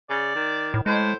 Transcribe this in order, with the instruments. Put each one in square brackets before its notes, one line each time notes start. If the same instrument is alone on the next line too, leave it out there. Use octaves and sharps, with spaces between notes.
[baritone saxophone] C#3 [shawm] D5
[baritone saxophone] D#3
[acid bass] A2
[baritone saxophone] A2 [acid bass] G#3 [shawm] C5